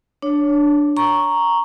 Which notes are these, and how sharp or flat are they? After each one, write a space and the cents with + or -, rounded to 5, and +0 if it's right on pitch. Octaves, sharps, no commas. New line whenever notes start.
D4 +0 C#5 +15
A#5 +0 C#6 +0